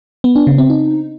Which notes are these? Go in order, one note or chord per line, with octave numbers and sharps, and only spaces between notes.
B3
D4
C#3
C4
D#4